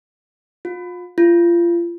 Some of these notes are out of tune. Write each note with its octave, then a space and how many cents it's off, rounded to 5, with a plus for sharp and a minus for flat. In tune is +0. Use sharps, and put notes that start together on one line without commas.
F4 +35
F4 -30